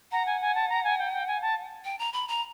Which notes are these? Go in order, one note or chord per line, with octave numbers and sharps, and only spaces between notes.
F#5 A#5
G#5
G#5
A5
A#5
G#5
G5
G5
G#5
A5
G5
A#5
B5
A#5